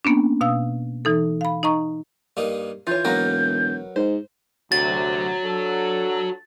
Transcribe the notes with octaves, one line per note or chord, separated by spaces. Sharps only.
A#3 B3 C#4 D4
B2 F5 D#6 E6
E3 D#4 A4
F5 B5
D#4 D#5 A#5 C#6
G2 A#3 D#4
E3 F4 C#5 G6
E1 F#3 A#3 D#4 A#4 B4
G#2 C5
D2 C3 F#4 C#5 A6
F#3 D4 A4